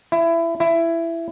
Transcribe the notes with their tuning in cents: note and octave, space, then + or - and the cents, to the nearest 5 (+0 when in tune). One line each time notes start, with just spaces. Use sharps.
E4 +20
E4 +15